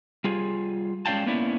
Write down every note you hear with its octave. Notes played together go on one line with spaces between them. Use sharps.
G3 F4 G#4
G#3 C#4 D5 F5 G5 A5
A#3 B3 C#4 E4 D5